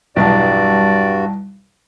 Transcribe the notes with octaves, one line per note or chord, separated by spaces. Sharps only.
B1 E2 G2 E3 G3 F#4 D5 A5